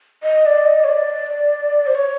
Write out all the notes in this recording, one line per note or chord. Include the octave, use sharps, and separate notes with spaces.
D#5
D5
D#5
C#5
D5
C5
C#5